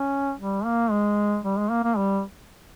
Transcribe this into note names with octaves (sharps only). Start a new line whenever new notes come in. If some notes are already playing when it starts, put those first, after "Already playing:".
Already playing: C#4
G3
A#3
G#3
G3
G#3
A#3
A#3
G3